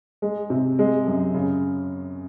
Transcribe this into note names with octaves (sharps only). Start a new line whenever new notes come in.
G#3
C3
G#3
F#2
C#3